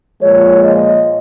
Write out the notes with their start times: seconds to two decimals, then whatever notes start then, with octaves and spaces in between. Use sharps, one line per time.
0.21 A#2 F3 G#3 C#5
0.63 D#5